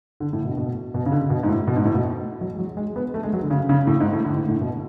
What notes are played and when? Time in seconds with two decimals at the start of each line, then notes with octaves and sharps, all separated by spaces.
0.20 D3
0.33 A2
0.45 B2
0.57 B2
0.94 B2
1.06 C#3
1.12 D3
1.30 B2
1.43 G#2
1.49 A2
1.67 B2
1.77 G#2
1.85 A2
1.95 B2
2.41 F#3
2.54 G#3
2.58 F#3
2.77 G#3
2.96 B3
3.14 A3
3.23 G#3
3.33 F#3
3.42 D3
3.51 C#3
3.69 C#3
3.87 A2
4.00 G#2
4.13 A2
4.25 D3
4.36 A2
4.49 A2
4.61 B2